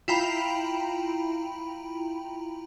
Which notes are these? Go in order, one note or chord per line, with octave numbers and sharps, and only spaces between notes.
E4 F4 G5 A#5 B5